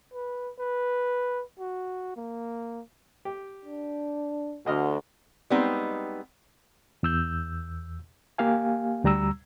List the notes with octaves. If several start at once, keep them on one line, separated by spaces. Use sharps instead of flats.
B4
B4
F#4
A#3
G4
D4
D2 D3 F#4 D#5 F6
G3 G#3 B3 C4 D#4
E2 E6 G6
A#3 G4 F5 G#5
D2 G3 A#5 E6